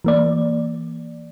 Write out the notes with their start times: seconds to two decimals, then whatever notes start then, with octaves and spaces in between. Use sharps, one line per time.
0.04 E3 A#3 D5